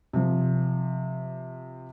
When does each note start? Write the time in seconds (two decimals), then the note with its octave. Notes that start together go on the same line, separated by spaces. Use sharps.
0.13 C3 F3